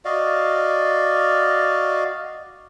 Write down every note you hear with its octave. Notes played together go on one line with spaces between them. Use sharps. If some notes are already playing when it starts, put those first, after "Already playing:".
F#4 D5 D#5 F5